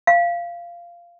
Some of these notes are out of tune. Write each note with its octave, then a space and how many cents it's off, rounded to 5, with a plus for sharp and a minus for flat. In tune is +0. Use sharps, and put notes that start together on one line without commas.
F5 -15